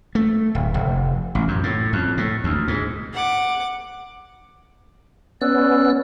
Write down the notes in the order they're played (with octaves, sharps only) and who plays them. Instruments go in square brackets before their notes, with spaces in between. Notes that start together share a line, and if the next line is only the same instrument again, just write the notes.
[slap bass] A3
D1
F1
A1
F#2
A2
F2
A2
D2
G#2
[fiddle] F#5 D6
[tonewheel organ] B3 C#4 [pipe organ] D5 E6 F#6